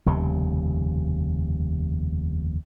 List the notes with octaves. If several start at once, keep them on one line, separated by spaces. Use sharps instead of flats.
F1 D#2 C#3 G3